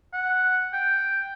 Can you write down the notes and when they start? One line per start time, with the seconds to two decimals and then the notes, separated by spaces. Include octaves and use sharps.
0.13 F#5
0.73 G5